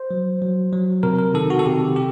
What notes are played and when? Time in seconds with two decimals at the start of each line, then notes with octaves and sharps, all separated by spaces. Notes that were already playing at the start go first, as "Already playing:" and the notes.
Already playing: C5
0.11 F#3
0.42 F#3
0.73 F#3
1.03 C3 A#4
1.19 A#4
1.34 D#3 A4
1.50 F#4
1.59 A4
1.66 C3 G4
1.96 G4